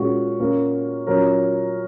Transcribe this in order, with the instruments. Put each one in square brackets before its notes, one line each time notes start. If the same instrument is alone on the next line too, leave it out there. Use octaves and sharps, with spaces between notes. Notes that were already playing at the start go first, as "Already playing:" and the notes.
Already playing: [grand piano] A#2 G#3 C#4 F#4
A#2 A#3 C#4
A#2 F#3 C#4 A#4